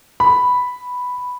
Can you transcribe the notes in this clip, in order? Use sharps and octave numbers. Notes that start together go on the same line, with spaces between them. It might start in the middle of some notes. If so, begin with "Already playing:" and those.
B5